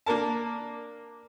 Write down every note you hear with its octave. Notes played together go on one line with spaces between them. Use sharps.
A#3 D4 A#4 A5